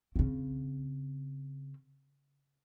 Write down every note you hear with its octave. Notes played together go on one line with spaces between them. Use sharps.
C#3 C4